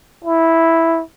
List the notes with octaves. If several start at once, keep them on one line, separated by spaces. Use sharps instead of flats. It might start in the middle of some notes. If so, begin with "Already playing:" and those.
E4